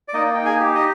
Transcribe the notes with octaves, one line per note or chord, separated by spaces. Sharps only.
D5
A#3 D#4 D#5
D#4 G5
G#4 G#5
G4
D#4 D#5